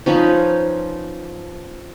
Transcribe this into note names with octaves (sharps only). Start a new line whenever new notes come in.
F3 C#4 D#4 B4